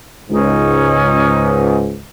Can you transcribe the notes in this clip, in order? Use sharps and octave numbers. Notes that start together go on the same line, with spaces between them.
C#2 G#2 C#4 D#4